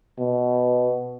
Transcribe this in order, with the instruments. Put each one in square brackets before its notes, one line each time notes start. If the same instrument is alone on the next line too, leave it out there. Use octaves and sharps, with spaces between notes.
[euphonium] B2